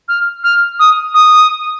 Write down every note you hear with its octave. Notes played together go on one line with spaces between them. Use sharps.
F6
F6
D#6
D#6